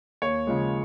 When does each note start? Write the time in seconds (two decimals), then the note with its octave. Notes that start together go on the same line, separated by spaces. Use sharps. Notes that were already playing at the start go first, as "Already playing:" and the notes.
0.22 D#2 C#5
0.47 C#3 F3 G#3